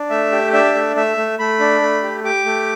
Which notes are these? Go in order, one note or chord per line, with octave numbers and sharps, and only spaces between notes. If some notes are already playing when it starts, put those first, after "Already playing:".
Already playing: D4
A3 E5
G4
D4 E5
A3
A3 E5
A3
A3 B5
D4
A3
G4
G4 D6
A3